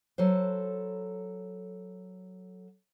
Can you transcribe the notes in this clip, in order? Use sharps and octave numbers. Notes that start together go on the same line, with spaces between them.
F#3 A4 B4 C5